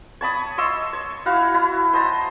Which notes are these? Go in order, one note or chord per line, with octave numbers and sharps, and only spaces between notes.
C#5 A5 B5 D#6
D#5 C6 C#6 E6
C#5
E4 F#4 F5
E4
C5 D#5 A5 A#5